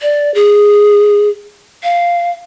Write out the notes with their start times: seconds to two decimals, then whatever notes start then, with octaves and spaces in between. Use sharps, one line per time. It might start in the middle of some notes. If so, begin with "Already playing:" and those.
0.02 D5
0.35 G#4
1.83 F5